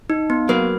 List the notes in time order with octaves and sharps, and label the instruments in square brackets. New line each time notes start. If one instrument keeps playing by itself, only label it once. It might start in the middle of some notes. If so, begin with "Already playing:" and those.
[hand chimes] D#4
B3
[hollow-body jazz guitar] F#3 A#3 [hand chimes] B4